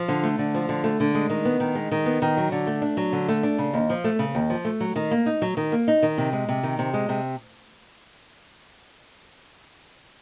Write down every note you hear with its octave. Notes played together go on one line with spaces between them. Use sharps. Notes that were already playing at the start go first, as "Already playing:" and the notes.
Already playing: F3
D3
A3
D3
F3
D3
A3
D3
G#3
D#3
B3
D#3
G#3
D#3
B3
D#3
F#3
D3
A3
D4
F#3
D3
A3
D4
C#3
D#2
F3
A3
C#3
D#2
F3
A3
F#3
D#3
A#3
D#4
F#3
D#3
A#3
D#4
D#3
C3
G#3
C3
D#3
C3
G#3
C3